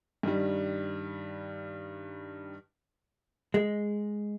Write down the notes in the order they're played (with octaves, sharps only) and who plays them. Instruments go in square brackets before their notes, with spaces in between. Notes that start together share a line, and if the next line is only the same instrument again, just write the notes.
[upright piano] G2 D#3 G3
[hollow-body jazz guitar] G#3